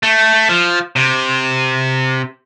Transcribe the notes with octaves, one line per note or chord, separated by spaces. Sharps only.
A3
F3
C3